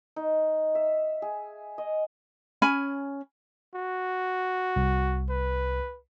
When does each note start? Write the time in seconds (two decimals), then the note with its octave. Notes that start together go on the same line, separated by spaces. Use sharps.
0.16 D#4
0.75 E5
1.22 G#4
1.78 D#5
2.62 C#4 G#5 B5
3.75 F#4
4.76 C2
5.30 B4